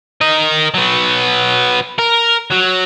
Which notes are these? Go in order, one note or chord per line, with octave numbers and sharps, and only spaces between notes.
A#4 D#5
F#3 B3
A#4
F#3